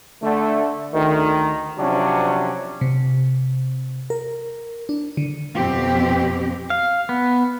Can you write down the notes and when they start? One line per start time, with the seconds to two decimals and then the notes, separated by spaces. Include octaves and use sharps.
0.22 D3 A3
0.93 D2 D#3
1.78 C3 F3 F#3 C#4 D4
2.81 C3
4.10 A#4
4.89 D4
5.17 D3
5.55 F2 B2 C4 G4
6.70 F5
7.09 B3